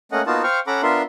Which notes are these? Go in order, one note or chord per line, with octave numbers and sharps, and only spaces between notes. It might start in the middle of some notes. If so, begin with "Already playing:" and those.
A3 A#3 C#4 D#5 F#5
A#3 B3 D#4 F4 F#4 A5
C5 F5 G5 C#6 F6
C#4 A4 F#5 A#5 B5 D6
B3 D4 F4 A#4 E5 C6